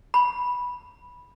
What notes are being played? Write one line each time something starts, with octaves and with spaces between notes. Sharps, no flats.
B5